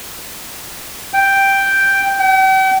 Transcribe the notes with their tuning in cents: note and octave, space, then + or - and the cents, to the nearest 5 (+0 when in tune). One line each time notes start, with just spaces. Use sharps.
G5 +0
G5 -45